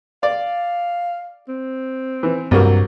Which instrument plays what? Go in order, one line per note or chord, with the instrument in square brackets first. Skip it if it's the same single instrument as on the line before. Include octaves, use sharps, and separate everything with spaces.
[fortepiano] D5 [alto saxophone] F5
[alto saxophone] C4
[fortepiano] E3
[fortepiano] C2 F#3 A#3 [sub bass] G2